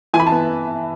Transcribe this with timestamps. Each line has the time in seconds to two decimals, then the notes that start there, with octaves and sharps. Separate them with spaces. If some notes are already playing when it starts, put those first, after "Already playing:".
0.14 E3 G#5
0.20 B5
0.27 A5
0.32 B3